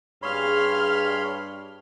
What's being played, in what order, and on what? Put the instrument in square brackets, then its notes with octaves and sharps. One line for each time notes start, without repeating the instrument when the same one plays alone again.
[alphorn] G2 [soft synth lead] G#4 [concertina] C#5 B5 C6 [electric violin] F5 F6